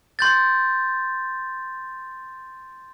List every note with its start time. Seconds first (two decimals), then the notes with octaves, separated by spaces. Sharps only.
0.19 C6 G6 A6